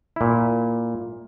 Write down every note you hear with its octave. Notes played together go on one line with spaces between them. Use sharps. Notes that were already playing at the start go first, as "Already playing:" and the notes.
A#2 E4